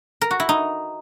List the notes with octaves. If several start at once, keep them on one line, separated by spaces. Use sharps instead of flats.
A#4
F#4
E4
D#4